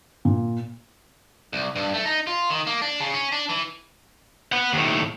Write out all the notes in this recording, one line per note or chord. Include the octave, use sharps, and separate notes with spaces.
A#2
C2
G2
A3
D#4
F4
D#3
A#3
D4
C#3
C#4
D4
E3
B4 F#5
D#2 A2